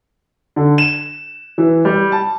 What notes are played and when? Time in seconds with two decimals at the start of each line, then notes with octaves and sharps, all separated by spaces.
0.56 D3
0.78 E7
1.58 E3
1.85 G3
2.12 A5